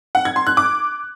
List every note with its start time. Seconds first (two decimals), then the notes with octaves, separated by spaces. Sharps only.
0.15 F#5
0.25 G#6
0.36 C6
0.47 F#6
0.57 D6